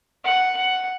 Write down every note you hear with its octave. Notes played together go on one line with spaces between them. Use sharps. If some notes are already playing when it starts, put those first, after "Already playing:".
F#5
F#5